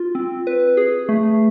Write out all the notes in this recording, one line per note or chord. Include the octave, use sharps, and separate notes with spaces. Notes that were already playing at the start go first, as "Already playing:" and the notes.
Already playing: F4
C4
B4
G#4
A3